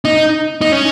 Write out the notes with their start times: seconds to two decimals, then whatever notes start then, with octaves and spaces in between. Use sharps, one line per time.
0.05 D#4
0.61 D#4
0.72 C#4